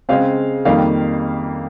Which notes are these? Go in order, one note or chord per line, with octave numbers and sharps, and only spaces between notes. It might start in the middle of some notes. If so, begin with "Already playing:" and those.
C#3 G#3 C4 F5
F2 D#3 G3 A#3 F5